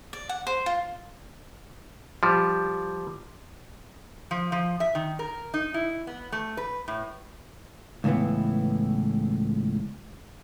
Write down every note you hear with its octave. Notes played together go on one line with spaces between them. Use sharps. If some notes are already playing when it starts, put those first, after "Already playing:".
D5
F#5
C5
F4
F3 G3
F3
F3
E5
D#3
A#4
D#4
E4
B3
A3
B4
A2
C#2 A2 D3 E3 B3